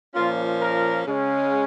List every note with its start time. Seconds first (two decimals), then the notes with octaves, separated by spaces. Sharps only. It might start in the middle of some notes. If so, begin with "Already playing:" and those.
0.14 A#2 F3 A#3 C#4 F4
0.60 A#4
1.06 C#3 G#3 C#4